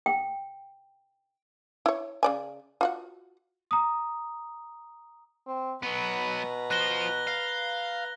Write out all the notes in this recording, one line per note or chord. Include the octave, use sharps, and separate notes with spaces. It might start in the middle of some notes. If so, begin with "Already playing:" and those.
G5
E4 C#5
C#3 D5 G#5
F4 F#4 F#5
A#5 D#6
C4
B2 F#3 B3 B4 A#5
F4 C5 F#6 A#6 G7
F5